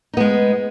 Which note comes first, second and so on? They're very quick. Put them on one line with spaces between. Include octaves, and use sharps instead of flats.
D#4 B3 G#3